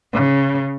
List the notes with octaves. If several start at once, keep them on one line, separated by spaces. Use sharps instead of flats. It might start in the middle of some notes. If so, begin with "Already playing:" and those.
C#3